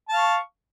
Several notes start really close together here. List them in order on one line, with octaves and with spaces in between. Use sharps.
A5 F5 C#6